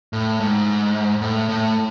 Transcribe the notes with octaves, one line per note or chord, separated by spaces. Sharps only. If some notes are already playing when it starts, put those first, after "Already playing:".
A2
G#2
A2
A2